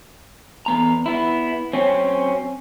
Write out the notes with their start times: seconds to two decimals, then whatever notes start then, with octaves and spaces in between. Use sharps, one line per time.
0.66 E2 B3 A#5
1.06 B3 E4
1.73 F#3 C4 C#4